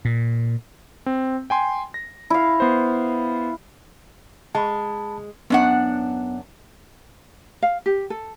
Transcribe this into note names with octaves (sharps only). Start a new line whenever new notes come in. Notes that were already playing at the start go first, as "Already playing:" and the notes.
A#2
C4
G5 G#5 C6
A#6
E4 F5
B3 C5
G#3 A5 B5
F#2 B3 D4 F#5
F5
G4
A4